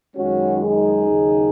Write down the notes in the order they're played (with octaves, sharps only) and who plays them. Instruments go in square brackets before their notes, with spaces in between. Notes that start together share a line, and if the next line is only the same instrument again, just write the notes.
[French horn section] F#2 D#3 G#3 C#4 F#4
D#4 G#4
D#2 C#3 F#3